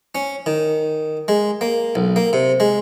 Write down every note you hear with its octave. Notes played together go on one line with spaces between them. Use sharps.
C#4
D#3
G#3
A#3
B1
A#3
C3
G#3